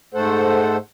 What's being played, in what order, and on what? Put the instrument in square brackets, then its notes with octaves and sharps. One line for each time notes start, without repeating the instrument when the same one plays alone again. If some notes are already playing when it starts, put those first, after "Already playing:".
[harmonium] G#2 A3 A4 C5 F#5